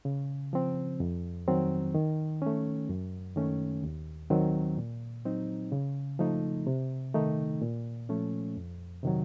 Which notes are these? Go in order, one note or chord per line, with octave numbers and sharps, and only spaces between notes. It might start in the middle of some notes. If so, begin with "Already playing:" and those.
C#3
F3 C4
F2
D#3 F#3 C4
D#3
A3 C#4
F#2
D#3 A3 C#4
D#2
D#3 F#3 C4
A#2
F#3 C4 D#4
C#3
F3 A3 D#4
C3
D#3 A3 D#4
A#2
F3 A3 C#4
F2
C3 D#3 F#3